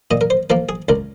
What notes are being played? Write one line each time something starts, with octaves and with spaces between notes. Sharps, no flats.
A#2 D#5
A#4
C5
F3 A#3 A#4
G#4
C#2 A#4